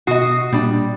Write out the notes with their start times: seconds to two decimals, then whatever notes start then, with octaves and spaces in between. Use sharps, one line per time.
0.07 B2 F#4 D#5 D#6 C7
0.52 A#2 G3 D4